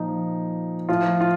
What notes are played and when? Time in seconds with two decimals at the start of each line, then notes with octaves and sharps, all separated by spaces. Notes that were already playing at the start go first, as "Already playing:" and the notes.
Already playing: A#2 F3 D#4
0.89 A2 F3 F4
1.21 F4